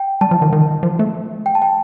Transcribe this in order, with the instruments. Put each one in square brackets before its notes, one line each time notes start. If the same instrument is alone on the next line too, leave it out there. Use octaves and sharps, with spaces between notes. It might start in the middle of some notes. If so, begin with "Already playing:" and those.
Already playing: [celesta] G5
[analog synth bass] G3 [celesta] A5
[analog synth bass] F3
D#3
D#3
F3
A3
[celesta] G5
A5
G5